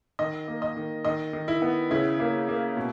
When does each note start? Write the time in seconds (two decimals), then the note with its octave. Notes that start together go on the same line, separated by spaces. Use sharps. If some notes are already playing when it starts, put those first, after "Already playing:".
0.19 D#3 D#5
0.48 A#3
0.62 D#5
0.77 D#3
1.05 D#3 D#5
1.33 D#3
1.48 E4
1.62 B3
1.91 C#3 E4
2.20 A#3
2.49 A#3
2.77 B2